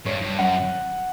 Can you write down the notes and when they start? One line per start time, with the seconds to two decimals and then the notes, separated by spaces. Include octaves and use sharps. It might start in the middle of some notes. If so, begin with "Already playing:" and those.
0.06 G2 C#5
0.22 G2
0.39 F#2 F#5